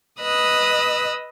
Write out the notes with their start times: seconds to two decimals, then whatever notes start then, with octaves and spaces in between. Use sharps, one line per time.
0.21 B4 D#5 D#6 E6 F#6